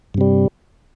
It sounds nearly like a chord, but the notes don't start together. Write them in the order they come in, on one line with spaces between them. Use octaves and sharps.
G2 C3 G3